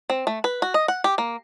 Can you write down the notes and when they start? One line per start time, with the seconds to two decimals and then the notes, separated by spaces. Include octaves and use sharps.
0.10 C4
0.27 A3
0.44 B4
0.62 F#4
0.74 D#5
0.88 F#5
1.04 G4
1.18 A#3